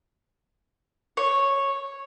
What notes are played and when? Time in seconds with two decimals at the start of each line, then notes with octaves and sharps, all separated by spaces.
1.17 C#5